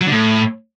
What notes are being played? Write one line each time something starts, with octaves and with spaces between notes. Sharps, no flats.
F#3
D3
A2